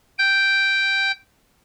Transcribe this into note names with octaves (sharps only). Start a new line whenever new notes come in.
G5 G6